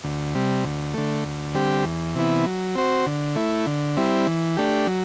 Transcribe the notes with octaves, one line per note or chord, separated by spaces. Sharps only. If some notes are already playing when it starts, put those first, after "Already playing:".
D2
C3 G3
D2
D3 A3
D2
D3 G3 C4 G4
E2
C3 E3 B3 E4
F#3
C4 F#4 C5
D3
A3 E4
D3
G3 C4 E4
E3
A3 D4 G4
F#3